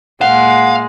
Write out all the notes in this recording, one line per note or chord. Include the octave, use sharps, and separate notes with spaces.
A#2 G#3 F5 F#5